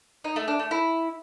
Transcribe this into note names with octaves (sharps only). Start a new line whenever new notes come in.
D#4
A3
D4
A3
E4